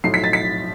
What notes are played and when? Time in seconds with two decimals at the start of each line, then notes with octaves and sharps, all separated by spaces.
0.04 B1 A2 F3 C7
0.14 B6
0.24 A6
0.33 B6